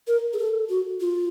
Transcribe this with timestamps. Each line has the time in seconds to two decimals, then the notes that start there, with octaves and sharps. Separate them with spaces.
0.07 A#4
0.33 G#4
0.38 A4
0.69 F#4
1.00 F4